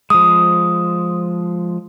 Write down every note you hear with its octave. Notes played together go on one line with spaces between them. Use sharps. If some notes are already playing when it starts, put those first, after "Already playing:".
F3 G#3 D#6